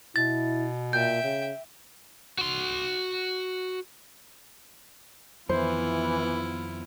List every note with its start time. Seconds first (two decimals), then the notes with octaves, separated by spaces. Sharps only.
0.16 B2 E4 A6
0.93 A#2 E5 G5 G6
1.24 C#3
2.39 F#4 C6
5.49 F2 D#3 E3 B3 E4 F4 C5